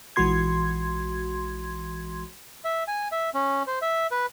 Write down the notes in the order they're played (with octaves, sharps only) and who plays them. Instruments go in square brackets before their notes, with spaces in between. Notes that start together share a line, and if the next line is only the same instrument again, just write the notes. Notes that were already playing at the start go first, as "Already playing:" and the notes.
[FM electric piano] A#1 E3 G#3 F#4 C6 G#6
[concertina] E5
G#5
E5
C#4
C5
E5
B4